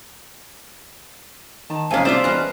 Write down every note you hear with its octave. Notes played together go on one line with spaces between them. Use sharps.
D#3 A5
F#1 C3 F3 G#3 A#3 C#4 F5 G#5
C2 D4 F4 C5 D5 E5
E1 G#3 C#4 B4 A#5